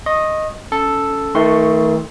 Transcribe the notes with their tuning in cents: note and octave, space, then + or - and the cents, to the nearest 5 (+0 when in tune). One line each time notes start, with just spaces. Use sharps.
D#5 +0 C#6 -35
C#4 +20 A4 +0
D#3 +40 A3 +10 C6 +0